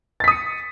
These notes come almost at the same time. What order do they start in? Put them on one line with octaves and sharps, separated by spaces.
A6 B6 D#6 C#7